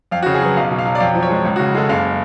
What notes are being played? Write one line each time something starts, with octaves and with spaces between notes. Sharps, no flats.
F2 F5
F#4
C#3
G#4
F#3 B4
B1 F5
B2
F5
F#3
D5
F2 F5
F3
C#5
G#3
C#2
F#4
C#3
G#3 A4
F#1 F5